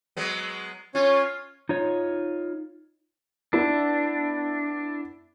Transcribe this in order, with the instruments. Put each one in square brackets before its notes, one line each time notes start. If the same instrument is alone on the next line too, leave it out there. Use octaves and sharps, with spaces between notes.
[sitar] F#3 G#3 B3
[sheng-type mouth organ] C#4 C#5 [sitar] F4
[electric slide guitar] D#4 F4 C#5
[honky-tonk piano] B3 E4 [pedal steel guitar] D4